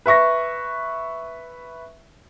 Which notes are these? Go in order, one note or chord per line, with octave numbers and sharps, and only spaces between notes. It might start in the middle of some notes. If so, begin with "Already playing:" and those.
B4 E5 C#6 A#6